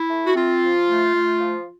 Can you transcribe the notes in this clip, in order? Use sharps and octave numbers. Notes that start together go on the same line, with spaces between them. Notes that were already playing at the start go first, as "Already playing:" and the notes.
Already playing: E4
A3
F#4
C4 F4
F3
A3
A3
F3